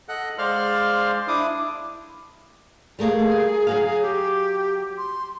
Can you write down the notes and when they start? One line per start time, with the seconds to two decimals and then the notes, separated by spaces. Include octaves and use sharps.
0.09 A4 D#5 F#5 F#6
0.38 G#3 C5 D5 F5 C6 F6
1.28 D4 E4 D6 D#6
2.99 G3 A3 A#3 G#4
3.67 F#3 F#4 F5
4.02 G4
4.98 C6